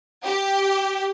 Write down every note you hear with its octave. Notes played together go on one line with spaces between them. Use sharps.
G4